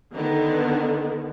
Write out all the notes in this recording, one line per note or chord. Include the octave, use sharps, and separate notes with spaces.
D3 D#3 B3